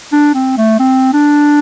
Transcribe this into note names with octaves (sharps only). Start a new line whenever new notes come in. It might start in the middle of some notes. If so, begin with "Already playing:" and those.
D4
C4
A3
C4
D4